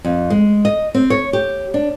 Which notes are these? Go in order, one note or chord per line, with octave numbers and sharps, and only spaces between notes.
F2
G#3
D#5
C4
C#5
G4
D4